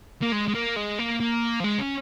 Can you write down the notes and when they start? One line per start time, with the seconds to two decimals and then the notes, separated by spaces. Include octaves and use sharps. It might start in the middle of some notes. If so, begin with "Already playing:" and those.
0.22 A#3
0.32 G#3
0.48 G#3
0.54 A#3
0.76 G#3
0.99 A#3
1.20 A#3
1.60 F3
1.64 G#3
1.79 C#4